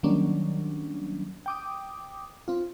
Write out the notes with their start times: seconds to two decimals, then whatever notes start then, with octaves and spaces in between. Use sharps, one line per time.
0.03 D#3 F#3 G3 A#3 C#4 D4
1.46 G5 D6 D#6
2.48 C4 F4